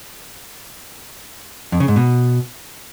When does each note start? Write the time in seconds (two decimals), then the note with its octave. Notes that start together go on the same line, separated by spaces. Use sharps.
1.72 F2
1.80 C#3
1.88 G#2
1.96 B2